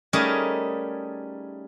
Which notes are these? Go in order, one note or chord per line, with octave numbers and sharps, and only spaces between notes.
G3 A3 C#4 D#4 G#4 A#4